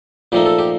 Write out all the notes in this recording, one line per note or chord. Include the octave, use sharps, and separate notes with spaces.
A#2 F3 A3 D#4 G4
A4
G4